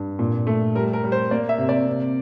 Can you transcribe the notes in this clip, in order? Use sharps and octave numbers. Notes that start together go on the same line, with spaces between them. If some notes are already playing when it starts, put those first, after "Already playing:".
Already playing: G2
A#2
A3
G3 A#4
A#4
G3
C5
A#3 D5
E5
C3
D5
C3